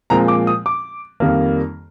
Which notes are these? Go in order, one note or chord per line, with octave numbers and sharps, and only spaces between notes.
A#2 F3 G#3 C4 A#5
D6
D#6
D6
F2 D#3 G3 A#3